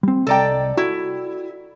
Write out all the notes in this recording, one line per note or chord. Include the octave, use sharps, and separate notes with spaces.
G3 C4
C2 A4 D5 D#5 G5 A#5
E4 F#4